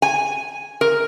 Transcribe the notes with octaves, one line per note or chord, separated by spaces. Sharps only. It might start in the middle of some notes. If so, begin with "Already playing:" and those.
G#5
A#4